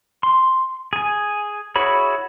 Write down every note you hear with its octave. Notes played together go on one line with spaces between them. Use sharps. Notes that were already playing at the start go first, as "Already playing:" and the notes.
C6
G#4 G#5
E4 F#4 G#4 C#5 B5